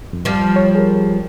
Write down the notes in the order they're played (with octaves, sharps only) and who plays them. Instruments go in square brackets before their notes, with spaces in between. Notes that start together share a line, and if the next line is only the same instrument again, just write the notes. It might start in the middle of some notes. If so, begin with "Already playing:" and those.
[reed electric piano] F2
[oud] F3 G3
[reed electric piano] C#5
G#4 A#4